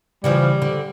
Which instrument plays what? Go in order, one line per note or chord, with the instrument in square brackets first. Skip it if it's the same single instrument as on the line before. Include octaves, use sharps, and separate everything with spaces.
[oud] C#3 E3 F3 [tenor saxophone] G3
[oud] D3